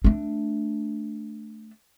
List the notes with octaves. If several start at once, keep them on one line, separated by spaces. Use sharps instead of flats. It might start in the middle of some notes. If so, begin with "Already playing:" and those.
A3 D4